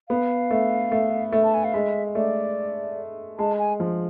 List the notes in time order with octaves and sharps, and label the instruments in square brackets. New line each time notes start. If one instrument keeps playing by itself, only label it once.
[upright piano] B3 [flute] F5
[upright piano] A3
A3
A3
[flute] A5
G#5
F5
[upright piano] G#3 [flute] E5
[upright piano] A3 [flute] D5
[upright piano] G#3 [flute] A5
[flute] G#5
[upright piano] F3